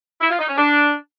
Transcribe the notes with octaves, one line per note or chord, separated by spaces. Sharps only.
E4
F4
D#4
C#4
D4